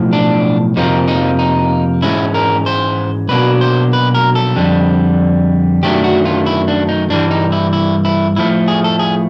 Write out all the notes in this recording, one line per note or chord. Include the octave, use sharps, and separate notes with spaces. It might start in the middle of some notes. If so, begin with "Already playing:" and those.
Already playing: B1 A2 F3
D4
F2 C3 F3 A#3 D#4
D#4
D#4
G#2 E3 G#3 C#4 E4
A#4
C5
B1 B2 F#3 A#3 D4 B4
C5
B4
A#4
A4
F2 D3 G3
F#2 D#3 F#3 A3 D4 G4
F#4
F4
E4
D4
D#4
G2 E3 G3 D4
D#4
E4
E4
E4
A2 F3 A3 E4
G#4
A4
G#4